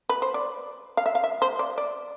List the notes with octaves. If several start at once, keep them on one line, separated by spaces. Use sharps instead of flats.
B4
C5
D5
F5
E5
F5
E5
C5
D5
D5